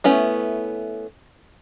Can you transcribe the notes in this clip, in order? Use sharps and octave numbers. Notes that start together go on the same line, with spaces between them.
A3 B3 C#4 E4